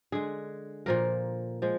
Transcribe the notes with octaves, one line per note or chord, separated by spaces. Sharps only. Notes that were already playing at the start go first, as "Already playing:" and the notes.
D3 G#3 G#4
A#2 F3 A#3 A#4
F3 G#3